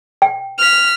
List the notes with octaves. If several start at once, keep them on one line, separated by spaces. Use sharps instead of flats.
G5
F6 B6